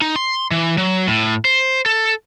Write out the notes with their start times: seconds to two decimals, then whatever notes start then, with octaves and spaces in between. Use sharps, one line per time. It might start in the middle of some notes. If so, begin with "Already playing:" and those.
0.01 D#4
0.16 C6
0.51 E3
0.78 F#3
1.07 A2
1.45 C5
1.86 A4